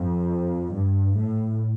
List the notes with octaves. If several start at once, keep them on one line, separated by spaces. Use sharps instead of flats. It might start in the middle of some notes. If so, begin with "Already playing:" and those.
Already playing: F2
G2
A2